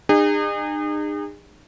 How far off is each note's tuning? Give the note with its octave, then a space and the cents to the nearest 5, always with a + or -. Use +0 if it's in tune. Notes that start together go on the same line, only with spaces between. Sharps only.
D#4 -45 G#4 -40